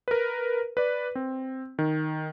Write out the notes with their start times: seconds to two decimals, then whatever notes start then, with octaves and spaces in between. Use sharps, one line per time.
0.08 A#4 B4
0.77 B4 D5
1.15 C4
1.79 D#3